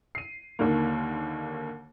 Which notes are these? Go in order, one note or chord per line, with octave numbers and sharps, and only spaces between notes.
C7 D#7
D#2 D3 D#3 A#3